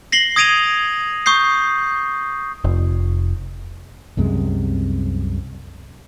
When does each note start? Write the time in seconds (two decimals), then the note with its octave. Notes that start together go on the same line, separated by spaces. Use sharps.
0.12 A#6 C7 F#7 G7
0.36 D#6 G#6 A#6 D7 D#7 F7
1.26 C#6 D#6 G6 C7
2.64 F1
4.17 C2 F#2 C3 G#3